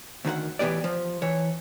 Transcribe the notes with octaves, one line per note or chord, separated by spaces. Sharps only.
D2 D#3 B4 F#5
A2 E3 B3 G4 D5
F3
E3 C#5